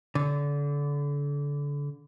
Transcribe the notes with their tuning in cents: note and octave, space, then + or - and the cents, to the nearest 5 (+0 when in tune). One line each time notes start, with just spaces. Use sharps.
D3 -30